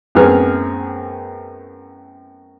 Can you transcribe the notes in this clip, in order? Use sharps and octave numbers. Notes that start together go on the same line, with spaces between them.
F#2 A2 B3 C4 G#4 F6